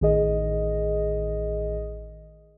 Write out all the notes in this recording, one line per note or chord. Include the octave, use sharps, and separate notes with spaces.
A1 D#3 G#4 D#5